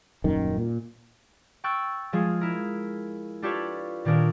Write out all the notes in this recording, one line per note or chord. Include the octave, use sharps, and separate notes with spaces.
D#1 F#2 D#3
A#2
G5 C#6 E6 F#6 A6
F3 G#3 F4 G#4
E4 A#4
D4 F4 G4 A4 B4 C#5
A#2 D#3 C#4 D4 A#4